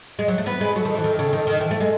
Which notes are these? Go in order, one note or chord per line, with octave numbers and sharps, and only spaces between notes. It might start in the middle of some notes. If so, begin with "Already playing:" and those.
G#3
F#3
A3
B3 B4
G#3
F#3 A4
D#3
E3
D#3
C#3
D#3
D#3
E3 A4
A3
G#3